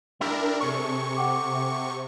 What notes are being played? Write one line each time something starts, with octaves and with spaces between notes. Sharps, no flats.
D4 E4 G4 A#4
C3 G#4 A4 C#5 C#6
F#5 G5 D6